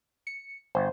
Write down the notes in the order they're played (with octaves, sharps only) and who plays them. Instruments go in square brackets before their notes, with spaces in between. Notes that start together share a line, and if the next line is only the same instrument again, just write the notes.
[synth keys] C#7
[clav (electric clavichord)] G1 [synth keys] C5